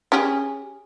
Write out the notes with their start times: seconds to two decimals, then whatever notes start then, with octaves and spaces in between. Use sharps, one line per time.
0.12 C#4 G4 G#4